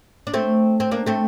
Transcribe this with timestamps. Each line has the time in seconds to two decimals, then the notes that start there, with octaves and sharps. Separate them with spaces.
0.27 D4
0.34 A3 C4
0.80 C4
0.92 A#3 D4
1.06 A3 C4